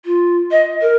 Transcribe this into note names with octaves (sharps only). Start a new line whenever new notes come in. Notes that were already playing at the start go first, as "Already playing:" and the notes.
F4
D#5
A#4